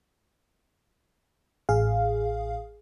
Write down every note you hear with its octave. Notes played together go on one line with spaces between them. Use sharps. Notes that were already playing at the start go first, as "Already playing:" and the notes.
A1 G#4 F5